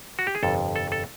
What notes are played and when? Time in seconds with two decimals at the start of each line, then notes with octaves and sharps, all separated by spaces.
0.19 F#4
0.27 G4
0.35 G#4
0.43 G1 F2 C3 A4
0.76 A4
0.92 A4